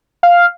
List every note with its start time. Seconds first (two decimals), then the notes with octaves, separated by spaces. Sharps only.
0.23 F5